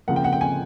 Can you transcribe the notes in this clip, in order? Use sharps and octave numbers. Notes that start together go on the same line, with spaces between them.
C#3 F3 A#3 F#5
G5
F#5
G5
G#5